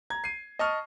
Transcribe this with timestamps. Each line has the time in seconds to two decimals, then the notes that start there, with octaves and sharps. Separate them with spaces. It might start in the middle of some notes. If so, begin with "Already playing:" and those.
0.10 A#5 G#6
0.24 C7 D#7
0.59 D#5 A5 C#6 D#6 F6